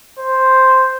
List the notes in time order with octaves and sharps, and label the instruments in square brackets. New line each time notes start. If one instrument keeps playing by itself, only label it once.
[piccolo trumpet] C5